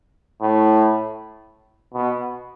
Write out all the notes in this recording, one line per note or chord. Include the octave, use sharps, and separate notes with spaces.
A2
B2